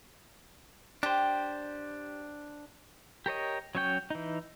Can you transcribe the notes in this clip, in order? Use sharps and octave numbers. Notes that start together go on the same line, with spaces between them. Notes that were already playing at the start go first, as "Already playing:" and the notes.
D4 G4 C5
G4 A#4 C#5 D#5
F#3 C#4 C#5 G5
E3 D#4